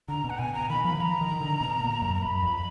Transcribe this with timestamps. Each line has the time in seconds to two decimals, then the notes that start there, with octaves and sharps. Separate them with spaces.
0.08 D3 A#5
0.24 B2
0.30 F#5
0.39 B2 G#5
0.54 B2 A#5
0.69 D#3 B5
0.85 F3 B5
0.95 D#3
1.00 F3 A#5
1.21 D#3
1.31 D#3
1.41 D3
1.61 B2
1.81 A#2
2.02 F#2
2.15 A#5
2.22 F#2 B5
2.42 F2